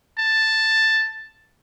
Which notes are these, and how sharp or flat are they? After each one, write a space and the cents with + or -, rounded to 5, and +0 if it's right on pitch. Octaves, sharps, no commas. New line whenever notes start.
A5 +5